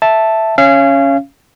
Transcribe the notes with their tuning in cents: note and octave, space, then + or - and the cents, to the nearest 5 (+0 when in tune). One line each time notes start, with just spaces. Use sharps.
E5 +0 A5 +0
C#4 +0 F5 -30